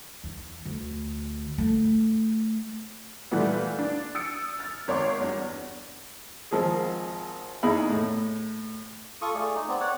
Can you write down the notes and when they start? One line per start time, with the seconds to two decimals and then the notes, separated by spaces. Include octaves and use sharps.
0.24 E2
0.65 D2
1.58 A3
3.31 A#2 E3 G3 A3 B3
3.79 D4
4.15 D#6 E6 A6 C#7 D7
4.59 F6 A6
4.88 G#1 C#5 C6 D6
5.20 E2 G2
6.51 G#1 F3 A#3 G#4
7.63 E2 D#4 E4 G#4 B5
7.89 A2
9.22 F4 A4 C#6 D#6
9.35 A3 G#4 D5
9.55 D#4
9.68 B3 C4 D5
9.81 C#5 D5 F#5